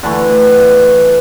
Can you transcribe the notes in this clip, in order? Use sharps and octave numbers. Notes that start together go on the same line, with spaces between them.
D3 E3 A3